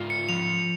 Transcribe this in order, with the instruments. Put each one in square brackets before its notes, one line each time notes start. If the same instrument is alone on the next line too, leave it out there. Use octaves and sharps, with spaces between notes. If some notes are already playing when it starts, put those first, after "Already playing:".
Already playing: [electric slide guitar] G#2 F4
[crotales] C#7
[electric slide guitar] F3 [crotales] F7